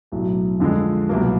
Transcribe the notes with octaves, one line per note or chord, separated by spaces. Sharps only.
B1 A2 F#3
F2 D3 F3 G#3
C2 B2 F#3 A#3